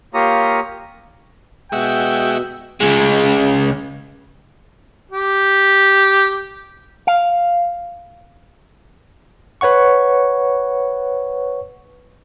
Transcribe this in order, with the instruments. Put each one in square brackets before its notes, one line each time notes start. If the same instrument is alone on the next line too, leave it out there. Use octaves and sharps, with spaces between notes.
[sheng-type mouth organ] A#3 F4 G4 C#5 A#5 D#6
[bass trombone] B2 [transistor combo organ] G#3 F#4 E5 [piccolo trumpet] G5
[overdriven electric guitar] C#2 G#3
[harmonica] G4
[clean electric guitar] F5
[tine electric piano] B4 C#5 F#5 C#6